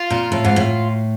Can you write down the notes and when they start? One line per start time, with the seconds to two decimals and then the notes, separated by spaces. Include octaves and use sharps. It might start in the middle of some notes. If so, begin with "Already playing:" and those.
Already playing: F4
0.10 A#2
0.32 A2
0.44 G#2
0.56 A2